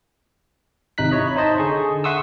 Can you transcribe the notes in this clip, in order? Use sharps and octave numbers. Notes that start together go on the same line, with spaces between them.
G#1 C3 D#4 F#6 B6
E4 C#5 D#5
D#4 C5 D#5 A5
D3 G#4 C#6
E5 F#5 C6 C#6 D#6 E6